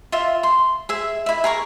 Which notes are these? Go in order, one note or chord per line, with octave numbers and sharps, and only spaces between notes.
F4 E5
C6
G#4 E5
E4 E5
G#4 A#4 C#6